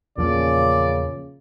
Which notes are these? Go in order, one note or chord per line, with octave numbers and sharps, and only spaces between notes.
E2 A#2 C#3 F3 D5